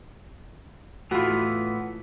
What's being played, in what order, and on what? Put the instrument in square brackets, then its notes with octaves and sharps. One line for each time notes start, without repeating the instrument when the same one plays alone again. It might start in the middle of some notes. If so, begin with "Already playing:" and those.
[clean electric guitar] A2 E3 B3 [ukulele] F4 F#4